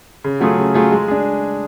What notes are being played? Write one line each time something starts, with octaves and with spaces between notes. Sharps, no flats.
C#3
F#3 A3 F4 G#4
C#3
F#3 A3 F4 G#4
G#3
D4 G#4